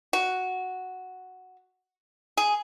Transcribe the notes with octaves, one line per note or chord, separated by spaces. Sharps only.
F#4
G#4